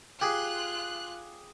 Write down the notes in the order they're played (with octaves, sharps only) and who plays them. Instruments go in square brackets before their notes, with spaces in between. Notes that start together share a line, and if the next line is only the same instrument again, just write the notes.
[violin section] F4 F#6 [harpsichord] G4 G#4